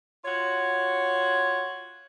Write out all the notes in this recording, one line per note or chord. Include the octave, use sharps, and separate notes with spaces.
F4 F#4 C#5